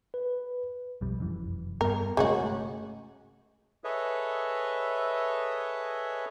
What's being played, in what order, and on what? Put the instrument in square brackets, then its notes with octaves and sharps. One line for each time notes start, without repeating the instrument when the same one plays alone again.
[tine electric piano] B4
[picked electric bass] B1 F2 G3
F1 F#2 E3
[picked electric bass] G2 G3 B3 [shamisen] A#4
[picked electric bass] G1 C3 A3 [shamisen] G#3 C#4 F#4
[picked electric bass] A3
[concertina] G#4 A4 B4 C#5 D#5 E5